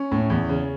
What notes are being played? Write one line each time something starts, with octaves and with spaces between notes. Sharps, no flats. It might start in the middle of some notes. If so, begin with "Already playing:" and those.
Already playing: C#4
A2
E2
C#3